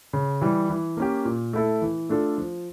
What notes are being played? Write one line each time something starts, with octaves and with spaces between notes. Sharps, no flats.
C#3
E3 G3
E3
A#3 C#4 G4
A#2
A3 E4 A4
E3
A3 D4 F4 A4
F3